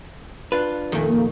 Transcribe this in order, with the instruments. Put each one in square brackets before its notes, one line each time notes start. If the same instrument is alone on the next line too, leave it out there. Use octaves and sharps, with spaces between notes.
[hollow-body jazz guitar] D4 F4 B4
[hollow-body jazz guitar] F2 A#2 [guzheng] D#3 A3
[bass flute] A#3